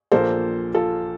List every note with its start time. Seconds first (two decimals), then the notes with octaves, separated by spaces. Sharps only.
0.12 A#1 A#2 F3 A#3 A4 C5
0.75 F4 A4